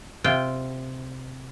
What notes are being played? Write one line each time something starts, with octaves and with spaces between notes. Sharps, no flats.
C3 F4 G5